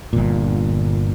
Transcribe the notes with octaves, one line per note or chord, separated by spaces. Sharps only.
G1 A#2